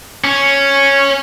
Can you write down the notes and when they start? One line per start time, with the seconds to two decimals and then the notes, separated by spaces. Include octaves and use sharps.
0.24 C#4